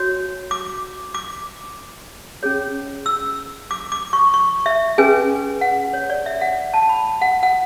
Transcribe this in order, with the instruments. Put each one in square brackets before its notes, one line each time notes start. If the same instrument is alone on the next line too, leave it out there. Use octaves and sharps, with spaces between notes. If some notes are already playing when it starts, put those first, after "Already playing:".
Already playing: [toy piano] F#4 C#5
D6
D6
C#4 G#4 C#5
E6
D6
D6
C#6
C#6
E5
C#4 G#4 B4 G#5
F#5
C#5
D5
E5
F#5
A5
B5
F#5
F#5